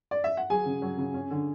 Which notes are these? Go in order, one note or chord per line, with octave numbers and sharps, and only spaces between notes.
D5
E5
F#5
F#3 G#4 G#5
C#3
F#3
C#3
C#4
D3